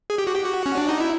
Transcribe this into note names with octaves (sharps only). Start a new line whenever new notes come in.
G#4
G4
F#4
G4
F#4
C#4
D4
D#4
E4